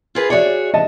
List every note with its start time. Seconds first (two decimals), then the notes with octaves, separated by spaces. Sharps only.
0.15 F4 G#4 B4
0.30 F#4 G#4 C#5 D5 E5
0.74 D#5 E5 A5